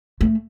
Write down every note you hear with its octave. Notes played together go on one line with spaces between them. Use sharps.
A3